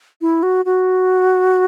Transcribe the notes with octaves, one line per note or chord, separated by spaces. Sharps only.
E4
F#4
F#4